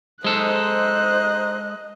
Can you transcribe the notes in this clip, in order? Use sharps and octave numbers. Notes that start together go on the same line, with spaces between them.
G#2 G#3 D#4 A4 C5 D#5 F#6